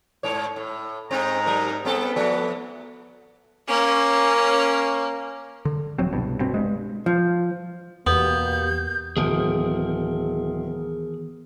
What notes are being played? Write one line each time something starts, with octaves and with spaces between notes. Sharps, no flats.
G#2 C#5
A2
G#2 C4 D#4 A#5
F#3 A#4
G3 B3 C4 A4
F3 A3
A#3 C#4
D3
D#1 F3 F#3 C4
C2 G2 B2
G1 B2 C4
G2 G#3
F3
E2 B2 A#3 B3 G4 G6
D1 D#3 E3 B3 G#4 A#4